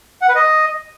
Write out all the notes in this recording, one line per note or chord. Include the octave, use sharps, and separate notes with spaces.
F#5
B4
D#5